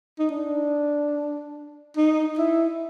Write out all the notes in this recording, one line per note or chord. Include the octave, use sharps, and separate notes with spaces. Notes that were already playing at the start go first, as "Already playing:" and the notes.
D#4
D4
D#4
E4